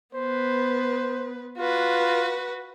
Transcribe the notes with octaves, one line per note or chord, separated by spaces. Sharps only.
B3 B4 C5
F4 F#4 B4